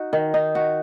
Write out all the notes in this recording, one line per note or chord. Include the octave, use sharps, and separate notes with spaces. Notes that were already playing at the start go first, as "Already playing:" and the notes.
Already playing: D#4 F#4
D#3
D#4
F#4